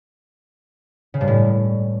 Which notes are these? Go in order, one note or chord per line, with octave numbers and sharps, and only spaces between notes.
C#3
G2
A2